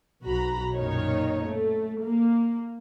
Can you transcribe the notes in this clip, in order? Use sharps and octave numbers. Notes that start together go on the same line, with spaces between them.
B1 F#4 A#5 B5
F#2 A#2 D#3 D#4 C#5
A3
A#3